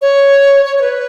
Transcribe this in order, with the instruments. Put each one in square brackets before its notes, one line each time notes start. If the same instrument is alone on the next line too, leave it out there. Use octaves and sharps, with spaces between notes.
[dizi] C#5
C#5
C#5
B4